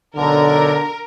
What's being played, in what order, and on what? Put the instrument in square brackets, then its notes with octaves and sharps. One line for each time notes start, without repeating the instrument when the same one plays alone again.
[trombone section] B1 D3 [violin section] A#4